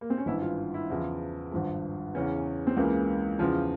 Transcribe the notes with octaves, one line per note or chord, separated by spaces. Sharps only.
A#3
C4
C#4
G#1 G2 E3 E4
F4
E4
E2 C#3 F3
G#1 G2 F3
E2 C#3 E3 C#4
C4
C#2 C#3 E3 A#3
E2 C#3 F3